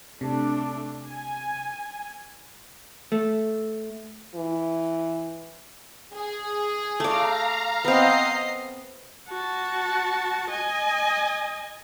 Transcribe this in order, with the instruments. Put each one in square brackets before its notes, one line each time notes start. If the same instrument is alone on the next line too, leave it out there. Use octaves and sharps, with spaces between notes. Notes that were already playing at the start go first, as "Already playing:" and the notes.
[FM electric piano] C3 [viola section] A3 D4
[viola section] G#5
[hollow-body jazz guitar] A3
[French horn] E3
[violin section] G#4
[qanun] A3 D5 [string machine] F5 A#5
[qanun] B3 C4 [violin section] D#5 C7
[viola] F#4 A5
D#5 G#5